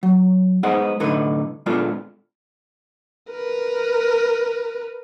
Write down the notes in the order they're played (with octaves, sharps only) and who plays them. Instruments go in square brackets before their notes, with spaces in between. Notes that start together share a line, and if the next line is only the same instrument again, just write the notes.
[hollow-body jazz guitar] F#3
G#3 B3 D#4 G#4 C5 F#5
C2 A2 D3 D#4 B4
A#2 G#3 B3 D4 F4 A4
[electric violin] A#4 B4